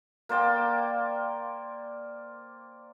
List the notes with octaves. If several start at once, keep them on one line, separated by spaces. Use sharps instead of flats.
A#3 C5 D5 G5